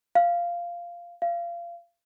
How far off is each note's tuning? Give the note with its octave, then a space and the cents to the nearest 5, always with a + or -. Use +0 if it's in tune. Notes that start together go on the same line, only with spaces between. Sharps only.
F5 -10
F5 -25